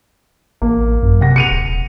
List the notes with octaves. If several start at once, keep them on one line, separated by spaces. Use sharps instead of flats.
A1 A#3
F#2
C3 F#5 A#6
C#7 D#7 F7
D#1